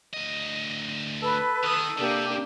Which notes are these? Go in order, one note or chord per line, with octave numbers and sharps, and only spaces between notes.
D2 D#5
A4 B4
D#3 D#6
C3 A#3 D4 G4